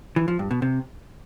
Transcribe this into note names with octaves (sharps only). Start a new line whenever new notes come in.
E3
F3
G2
B2
C3